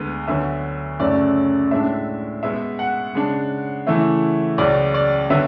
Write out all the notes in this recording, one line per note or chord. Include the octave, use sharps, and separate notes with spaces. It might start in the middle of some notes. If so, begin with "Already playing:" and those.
Already playing: D2 D3 G#3 B3
D2 D3 F#3 B3 E5
F#2 C#3 F#3 A3 C#4 D5
A2 G#3 D4 E5
B2 G#3 B3 E5
F#5
C#3 G#3 D4
C#3 E3 A3 E4
C#2 C#3 F#3 D5
D5
D3 F#3 B3 E5